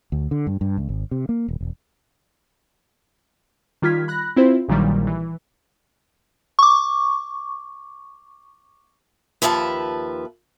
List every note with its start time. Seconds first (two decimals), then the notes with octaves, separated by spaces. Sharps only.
0.12 D2
0.31 D3
0.47 G2
0.61 G2
0.77 C#2
0.89 G#1
1.11 C3
1.29 A#3
1.48 D#1
1.61 E1
3.82 D#3 G3 F4 F6 G#6 B6
4.08 B5 F#6 A#6
4.36 C4 E4 F4 C5
4.68 A#1 A#2 D#3 E3 F#3 G3
5.07 E3
6.59 C#6 D6
9.42 D#2 F3 B4 E5 F5 A5